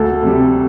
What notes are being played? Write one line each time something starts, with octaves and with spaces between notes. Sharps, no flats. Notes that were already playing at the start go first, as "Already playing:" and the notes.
Already playing: D2 A4
C3 G3